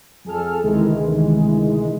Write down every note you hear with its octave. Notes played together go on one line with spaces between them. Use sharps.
F2 G#4 A4 F6
D2 C3 D#3 E3 G#3